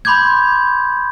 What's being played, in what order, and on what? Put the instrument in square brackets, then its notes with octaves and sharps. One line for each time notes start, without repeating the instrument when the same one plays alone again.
[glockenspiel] B5 C6 D6 G6 G#6